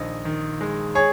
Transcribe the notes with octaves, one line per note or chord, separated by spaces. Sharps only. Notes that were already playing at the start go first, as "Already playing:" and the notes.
Already playing: A#1 D#3 D#5
D#3
G#3
G#4 C#5